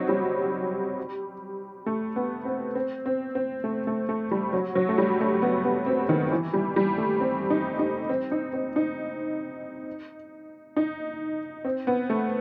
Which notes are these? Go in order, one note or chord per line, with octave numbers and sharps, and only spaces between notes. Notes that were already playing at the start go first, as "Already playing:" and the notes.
Already playing: F#3 C4 D#4
G3
A3
B3
C4
C4
C4
C4
A3
A3
A3
G3
F#3
F#3
A3
G3
A3
B3
B3
C4
D#3
E3
G3
G3
A3
C4
D#4
D#4
C4
D#4
C4
D#4
D#4
C4
B3
A3